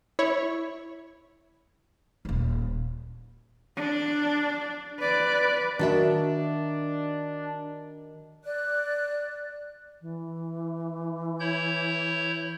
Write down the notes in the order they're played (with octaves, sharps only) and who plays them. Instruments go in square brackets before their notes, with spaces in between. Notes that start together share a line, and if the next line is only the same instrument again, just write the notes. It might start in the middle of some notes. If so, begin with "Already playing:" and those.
[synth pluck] E4 C#5
[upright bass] D#1 C#4
[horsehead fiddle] D4
B4 D5
[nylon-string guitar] D#3 F#4 E5 [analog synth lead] D4
[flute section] D5 F#6
[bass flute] E3
[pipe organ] E4 C#5 G6